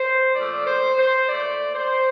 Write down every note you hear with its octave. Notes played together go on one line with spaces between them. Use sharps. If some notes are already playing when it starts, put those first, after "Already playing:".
Already playing: C5
A#2 F3 A3 D5
C5
C5
A#2 A3 D5
C5